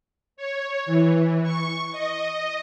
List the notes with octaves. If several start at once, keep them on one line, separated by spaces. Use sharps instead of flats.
C#5
E3
C#6
D#5